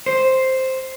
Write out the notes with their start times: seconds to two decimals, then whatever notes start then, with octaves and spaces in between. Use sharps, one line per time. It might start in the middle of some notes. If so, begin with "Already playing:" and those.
0.06 C5